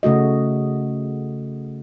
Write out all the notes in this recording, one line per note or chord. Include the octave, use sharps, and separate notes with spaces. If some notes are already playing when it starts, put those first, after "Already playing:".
C#3 A3 F#4 D#5